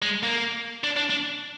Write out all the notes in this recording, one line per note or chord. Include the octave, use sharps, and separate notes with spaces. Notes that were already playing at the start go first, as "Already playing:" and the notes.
G#3
A#3
D4
D4
D4